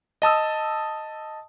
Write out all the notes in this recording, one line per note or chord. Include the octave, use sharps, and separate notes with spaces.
D#5 A5 D#6 E6